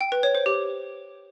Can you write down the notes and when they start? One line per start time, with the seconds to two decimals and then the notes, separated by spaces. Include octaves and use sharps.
0.01 G5
0.12 B4
0.23 C#5
0.35 C5
0.46 G4